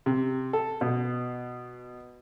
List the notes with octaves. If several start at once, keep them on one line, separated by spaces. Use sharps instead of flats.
C3
A4
B2